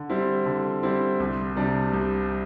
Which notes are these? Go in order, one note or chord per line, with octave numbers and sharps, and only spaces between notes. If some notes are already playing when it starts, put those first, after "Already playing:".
Already playing: D3
G3 C4 E4
D3
G3 C4 E4
C2
C3 G3 D4
C2